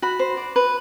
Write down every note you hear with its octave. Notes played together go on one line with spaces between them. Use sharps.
F#4 B5
C5
D5
B4